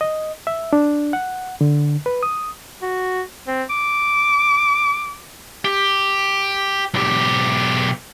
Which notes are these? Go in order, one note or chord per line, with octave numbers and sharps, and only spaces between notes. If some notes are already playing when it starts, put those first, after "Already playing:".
D#5
E5
D4
F#5
D3
B4
D#6
F#4
C4
D6
G4
B1 G4